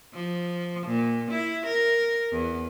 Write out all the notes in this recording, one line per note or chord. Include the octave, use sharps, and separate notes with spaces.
F3
A#2
E4
A#4
E2